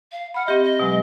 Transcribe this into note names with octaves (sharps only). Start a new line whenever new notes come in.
F5
F#5 B5 F6
C4 G4 D#5 E5
D#5
B2 F#3 G#3